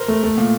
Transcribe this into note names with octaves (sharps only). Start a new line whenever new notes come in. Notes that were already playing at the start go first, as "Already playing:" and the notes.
Already playing: A#4 C5
A3
A3
A#2